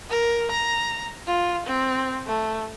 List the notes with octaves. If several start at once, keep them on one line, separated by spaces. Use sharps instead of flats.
A#4
A#5
F4
C4
A3